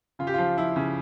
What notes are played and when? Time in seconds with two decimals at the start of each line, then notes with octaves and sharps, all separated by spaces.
0.19 C#3 F4
0.27 G4
0.34 F3 F4
0.57 F3 E4
0.76 C#3